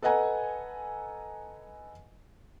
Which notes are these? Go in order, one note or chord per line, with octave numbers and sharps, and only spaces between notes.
A4 B4 D#5 F#5 G#5 A#5